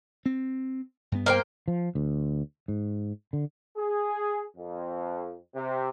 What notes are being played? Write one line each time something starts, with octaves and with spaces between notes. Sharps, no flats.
C4
G2 B3
A#3 C5 G5
F3
D2
G#2
D3
G#4
F2
C3